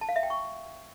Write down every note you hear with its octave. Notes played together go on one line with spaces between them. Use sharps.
A5
F5
E5
G5
C#6